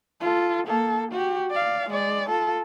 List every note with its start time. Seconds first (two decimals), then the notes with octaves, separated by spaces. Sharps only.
0.20 F4 A4
0.67 A#3 A4
1.12 F#4 G4
1.51 D5 F5
1.90 G#3 D5
2.29 F4 A4